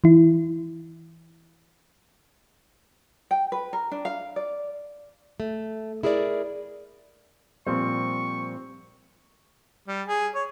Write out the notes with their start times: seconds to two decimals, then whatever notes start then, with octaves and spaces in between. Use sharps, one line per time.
0.04 E3 E4
3.31 G5
3.52 B4
3.73 A#4
3.91 D4
4.05 F5
4.36 D5
5.40 A3
6.03 E4 G#4 A#4 B4 D5
7.67 A#2 F3 G3 C4 C#6
9.88 G3
10.07 G#4
10.35 C#5